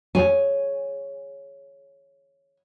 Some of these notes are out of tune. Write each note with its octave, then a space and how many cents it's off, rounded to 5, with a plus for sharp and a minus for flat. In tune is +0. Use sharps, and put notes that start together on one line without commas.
G#4 +0 C#5 +0 G#5 +0